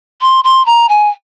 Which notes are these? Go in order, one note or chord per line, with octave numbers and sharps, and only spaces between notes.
C6
C6
A#5
G#5